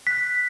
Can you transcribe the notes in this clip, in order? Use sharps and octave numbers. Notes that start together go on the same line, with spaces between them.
F#6 B6